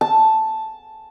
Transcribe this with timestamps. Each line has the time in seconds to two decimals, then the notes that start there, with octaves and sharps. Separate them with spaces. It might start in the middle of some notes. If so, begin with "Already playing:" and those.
0.01 A5